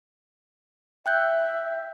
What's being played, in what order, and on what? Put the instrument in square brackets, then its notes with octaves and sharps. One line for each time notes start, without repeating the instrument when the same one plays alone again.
[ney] E5 [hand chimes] G5 F#6 G6